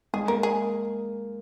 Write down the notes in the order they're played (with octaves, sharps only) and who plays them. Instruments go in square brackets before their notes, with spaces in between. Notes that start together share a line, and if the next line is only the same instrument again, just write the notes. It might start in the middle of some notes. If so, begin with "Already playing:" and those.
[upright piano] G#3 [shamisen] G#4
[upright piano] A#3 [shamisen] A#4
[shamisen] G#4